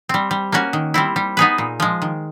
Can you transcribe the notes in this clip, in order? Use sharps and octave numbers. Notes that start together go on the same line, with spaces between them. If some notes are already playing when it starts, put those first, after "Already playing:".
G3 C4
G3
A#3 C#4 F#4
D#3
G3 C4 E4
G3
B3 D#4 G#4 B4
A#2
F3 G#3
D#3